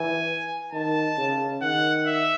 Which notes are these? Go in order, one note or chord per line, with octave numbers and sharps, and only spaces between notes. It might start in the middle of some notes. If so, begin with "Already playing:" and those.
Already playing: E3 G#5
D#3 A5
C#3
D#3 F#5
E5